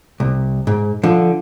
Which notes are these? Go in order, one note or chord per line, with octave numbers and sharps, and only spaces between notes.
C2
G#2
D3 F3